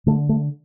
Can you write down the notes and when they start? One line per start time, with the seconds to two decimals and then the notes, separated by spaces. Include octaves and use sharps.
0.06 D3 A3
0.29 A3